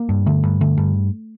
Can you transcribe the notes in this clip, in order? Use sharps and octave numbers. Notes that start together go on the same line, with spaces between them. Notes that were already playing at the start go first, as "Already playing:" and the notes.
Already playing: A#3
G2
D3 A3
G2
D3 A3
G2